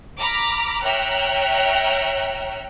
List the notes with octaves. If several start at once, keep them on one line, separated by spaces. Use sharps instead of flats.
A#5 B5 D6 F6
C#5 E5 G5 A#5 F6 F#6